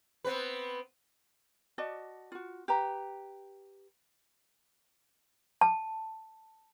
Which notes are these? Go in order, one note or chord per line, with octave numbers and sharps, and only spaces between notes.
B3 C4 B4
F#4 D5 D#5 A5
F4 F#4
G4 B4 A#5
A5